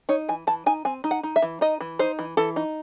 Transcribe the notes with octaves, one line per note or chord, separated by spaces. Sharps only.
D#4 C#5
E3 G#5
E3 A5
D#4 G#5
C4 G#5
D#4
F#5
D#4
E5
E3
D#4 D#5
E3
D#4 C5
E3
E3 A4
D#4